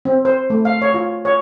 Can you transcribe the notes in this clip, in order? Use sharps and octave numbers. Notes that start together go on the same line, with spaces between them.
C4
C5
A3
F5
C#5
F4
C#5